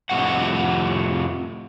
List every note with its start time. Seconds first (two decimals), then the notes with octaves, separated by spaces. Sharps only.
0.10 F2 A2 C3 F#4 F#5